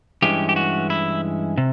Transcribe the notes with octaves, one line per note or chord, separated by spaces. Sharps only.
G2 E3 G#3 C#4 G4
G4
F#4
E4
C3